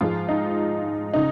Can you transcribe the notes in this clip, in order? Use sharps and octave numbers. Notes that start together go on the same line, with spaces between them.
G#2 F3 G#3 F4
D#4
C#3 D#4